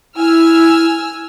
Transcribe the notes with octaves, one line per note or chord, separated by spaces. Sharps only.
E4 G#5 E6 F6